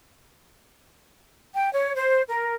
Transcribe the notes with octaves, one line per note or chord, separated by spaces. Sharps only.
G5
C#5
C5
A#4